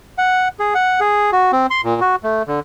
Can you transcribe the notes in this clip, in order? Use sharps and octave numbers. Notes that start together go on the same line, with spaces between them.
F#5
G#4
F#5
G#4
F#4
C4
C6
A#2
F#4
A3
D3